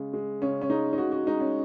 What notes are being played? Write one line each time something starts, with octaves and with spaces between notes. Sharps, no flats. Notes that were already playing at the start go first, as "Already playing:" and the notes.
Already playing: C#3 G#3
G#3
C#3 C#4
C#4
G#3 D#4
D#4
C#3 F#4
F#4
G#3 D#4
C#4